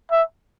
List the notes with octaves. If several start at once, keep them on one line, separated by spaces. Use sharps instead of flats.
E5